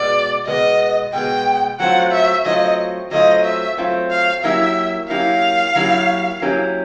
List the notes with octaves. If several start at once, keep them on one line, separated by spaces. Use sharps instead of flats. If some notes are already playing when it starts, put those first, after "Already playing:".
Already playing: B2 G#3 B3 D5
B2 G#3 B3 D#5
B2 G#3 B3 G5
F#3 A3 C4 F4 F#5
E5
F#3 A3 C4 F4 D#5
F#3 A3 C4 F4 D#5
E5
F#3 A3 C4 F4
F5
F#3 A#3 C#4 E4 G4 E5
F#3 A#3 C#4 E4 G4 F5
F#3 A#3 C#4 E4 G4
F#3 A#3 C#4 E4 G4